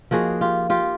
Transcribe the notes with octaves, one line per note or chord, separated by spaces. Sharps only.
F3 A#3 D#4 F#4 G#4
F4 G4
F4 G4